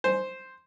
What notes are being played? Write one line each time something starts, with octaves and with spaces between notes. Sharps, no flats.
C5